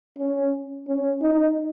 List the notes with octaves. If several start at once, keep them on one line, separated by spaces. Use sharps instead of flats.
C#4
C#4
D#4